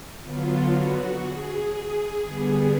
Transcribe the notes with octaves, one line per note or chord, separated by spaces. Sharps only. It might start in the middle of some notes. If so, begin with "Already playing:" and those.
D3 F#3 B3 F4
F#4
G#4
G#4
D3 G3 B3 G#4